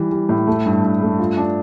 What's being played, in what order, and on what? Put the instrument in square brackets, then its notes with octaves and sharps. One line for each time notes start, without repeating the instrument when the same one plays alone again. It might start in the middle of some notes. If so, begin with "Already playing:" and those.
Already playing: [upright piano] E3 G3
G3
A2
A3
G2
G2
A3
F4
D4